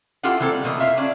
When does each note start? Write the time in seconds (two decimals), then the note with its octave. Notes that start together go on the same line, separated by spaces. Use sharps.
0.23 E4 F4 G4 A4 F#5
0.40 E3 A#3 C4 A4
0.52 G3
0.64 B2 E3 A#3
0.80 F4 E5 F5
0.97 C#4 D4 D5